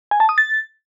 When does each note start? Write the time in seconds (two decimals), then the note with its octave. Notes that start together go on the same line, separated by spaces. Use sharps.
0.11 G#5
0.20 A5
0.29 D#6
0.38 A6